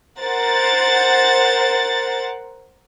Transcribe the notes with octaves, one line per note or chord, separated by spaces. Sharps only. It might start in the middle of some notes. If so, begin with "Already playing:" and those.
A#4 C5 F#5 A6